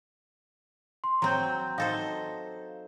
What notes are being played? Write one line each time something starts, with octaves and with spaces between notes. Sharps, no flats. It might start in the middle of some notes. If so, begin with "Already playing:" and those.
C6
F#3 C4 A#5 G6
D#4 A4 C5 F5